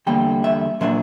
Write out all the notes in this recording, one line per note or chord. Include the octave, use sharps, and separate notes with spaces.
E2 D3 G3 A#3 G5
E5
A#2 F#3 A#3 D4 E5